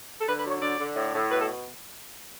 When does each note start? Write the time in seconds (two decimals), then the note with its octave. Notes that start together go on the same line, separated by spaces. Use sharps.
0.21 A4
0.27 D3 B4
0.39 B4
0.45 F#3
0.50 C#5
0.62 D3 D5
0.79 D3
0.96 A2
1.13 A2
1.30 B2 B4
1.39 A4